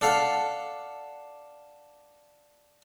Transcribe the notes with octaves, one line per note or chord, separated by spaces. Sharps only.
D4 A4 F5 F#5